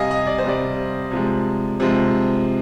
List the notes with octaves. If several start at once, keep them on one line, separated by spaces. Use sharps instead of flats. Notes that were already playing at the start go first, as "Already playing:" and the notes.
Already playing: C3 G3 D#5 F5 G#5
D#5
D5
C5
C3 G3 D5
C3 F3 G#3
C3 F3 G#3